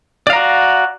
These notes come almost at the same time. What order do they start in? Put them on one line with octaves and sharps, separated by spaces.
D5 F5 A#5 F#4